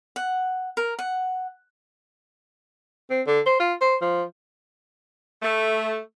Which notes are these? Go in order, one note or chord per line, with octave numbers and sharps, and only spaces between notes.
F#5
A#4
F#5
C4
D3
C5
F4
C5
F3
A3